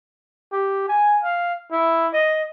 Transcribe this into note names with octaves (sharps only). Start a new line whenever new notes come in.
G4
G#5
F5
E4
D#5